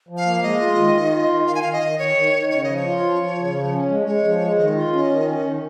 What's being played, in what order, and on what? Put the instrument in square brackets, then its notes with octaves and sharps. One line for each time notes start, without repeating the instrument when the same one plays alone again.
[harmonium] F3
[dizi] F5
[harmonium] A#3
[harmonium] G#3 [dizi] D#5
[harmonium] F4
D#3
D#3
F4
D#3
[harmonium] D#3 [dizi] F5
[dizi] G#5
[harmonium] D#3 [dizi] F5
[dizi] D#5
[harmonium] D#3
[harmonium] D#3 [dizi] C#5
[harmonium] D#3
D#3
[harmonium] C#3 [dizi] C#5
[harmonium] F3 [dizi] D#5
[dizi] C#5
[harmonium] F4
F3
F3
C#3
F3
C#4
G#3
[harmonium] G#3 [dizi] C#5
[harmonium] F3
G#3
[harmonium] D#3 [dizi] D#5
[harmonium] F4
C#4
D#3
C#4
D#3